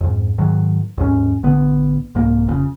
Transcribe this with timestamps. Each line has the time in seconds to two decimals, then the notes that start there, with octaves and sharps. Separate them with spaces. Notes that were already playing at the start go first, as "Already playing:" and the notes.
0.01 F2 G#2
0.38 G#2 D#3 F#3
0.98 D#2 G#2 C#4
1.43 A1 D3 B3
2.15 C2 G#2 A#3
2.46 F1 A#2 C#3